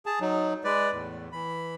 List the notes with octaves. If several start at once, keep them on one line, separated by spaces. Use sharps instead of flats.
G#4 A5
F#3 D#4
G#3 B4 D5
E2 A2
E3 B5